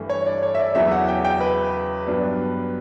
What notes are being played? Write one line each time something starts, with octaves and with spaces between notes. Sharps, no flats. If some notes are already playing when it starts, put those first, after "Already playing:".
Already playing: G2 E3 A3
C#5
D5
C#5
E5
D5
E2 C#3 F#3 C#4 E4 E5
F#5
G5
G5
B4
G2 F#3 B3 D4